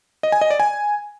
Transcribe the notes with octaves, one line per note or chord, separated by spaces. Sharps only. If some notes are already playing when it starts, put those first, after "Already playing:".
D#5
G#5
D#5
D5
G#5